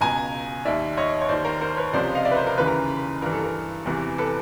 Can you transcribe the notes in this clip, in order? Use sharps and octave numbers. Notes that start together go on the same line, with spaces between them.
C#2 B2 G#5 A#5
D#2 D#3 D5 E5
C#5 D#5
C#5
D#2 D#3 C5 D5
A#4 C5
A#4 C5
B4 C#5
C#2 C3 F3 C5 D5
D#5 F5
D5 E5
B4
A#4 C5
A#4
D#2 C#3 E3 B4
A#4
G2 E3 A#4
A4
A#4
E2 C3 E3
A4 B4